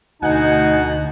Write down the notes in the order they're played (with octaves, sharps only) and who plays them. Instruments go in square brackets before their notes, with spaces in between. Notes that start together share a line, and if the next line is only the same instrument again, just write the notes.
[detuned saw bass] D2 [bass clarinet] B2 [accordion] D#4 [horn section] F#5 G#5